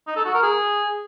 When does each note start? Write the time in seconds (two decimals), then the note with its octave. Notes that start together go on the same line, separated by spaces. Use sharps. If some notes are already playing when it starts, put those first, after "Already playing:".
0.07 D#4
0.16 A4
0.25 F#4
0.34 A#4
0.43 G#4